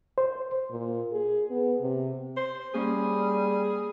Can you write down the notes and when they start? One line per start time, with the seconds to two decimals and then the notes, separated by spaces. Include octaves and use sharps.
0.18 C5
0.70 A#2
1.12 G#4
1.50 B3
1.80 C3
2.37 C5
2.74 G3 A#3 C#4 G#4